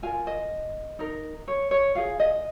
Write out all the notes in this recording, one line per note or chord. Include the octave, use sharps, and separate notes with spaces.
F4 A#4 G#5
D#5
D#4 A#4
C#5
C#5
F4 G#4 F5
D#5